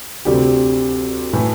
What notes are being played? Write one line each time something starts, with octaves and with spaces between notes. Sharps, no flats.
D2 C3 G3 C4 G4
A2 E3 A3